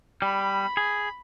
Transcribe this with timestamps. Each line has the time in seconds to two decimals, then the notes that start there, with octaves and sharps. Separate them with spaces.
0.22 G3 B5
0.77 G#4